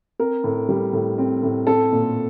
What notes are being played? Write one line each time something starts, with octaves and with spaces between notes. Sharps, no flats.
C4 A#4
A2
G3
A2
C4
A2
C4 A4
A#2